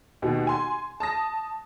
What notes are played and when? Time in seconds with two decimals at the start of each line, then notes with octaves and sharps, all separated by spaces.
0.22 D#2 B2
0.47 G#5 C6
1.00 A5 D#6 A#6